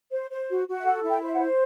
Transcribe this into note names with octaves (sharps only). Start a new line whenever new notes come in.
C5
C5
F#4
F#4
E5
A4 F#5
E4
G5
C5 E5
F#5
C5